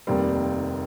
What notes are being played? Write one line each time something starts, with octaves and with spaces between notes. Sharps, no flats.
F1 D#2 D#3 G3 C4